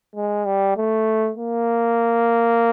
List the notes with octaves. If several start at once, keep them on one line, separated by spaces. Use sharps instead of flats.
G#3
G3
A3
A#3